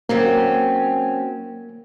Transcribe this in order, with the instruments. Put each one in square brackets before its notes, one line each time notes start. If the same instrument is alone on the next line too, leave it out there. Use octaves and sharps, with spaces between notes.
[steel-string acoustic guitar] F#3 C4 C#4 [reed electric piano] A#3